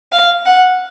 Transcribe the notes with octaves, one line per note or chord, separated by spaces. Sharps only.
F5
F#5